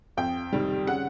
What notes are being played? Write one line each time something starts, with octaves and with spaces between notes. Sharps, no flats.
F2 G5
C3 D#3 G3
C#3 F#5